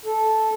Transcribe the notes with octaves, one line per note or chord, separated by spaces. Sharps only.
A4